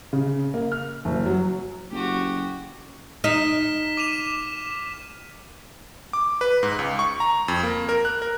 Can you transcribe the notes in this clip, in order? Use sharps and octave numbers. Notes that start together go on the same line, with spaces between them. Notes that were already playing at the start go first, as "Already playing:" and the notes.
C#3
A#3
F6
F#1
F#3
F#1 F#4 G4
D#4 F6 B6 E7
D6 D#7 F7
D6
B4
G#2
C#2
C#6
A#5
F2
A#3
A#4
F#6
A#4